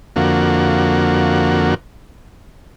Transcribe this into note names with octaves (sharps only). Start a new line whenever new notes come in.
F2 D3 A#3 F#4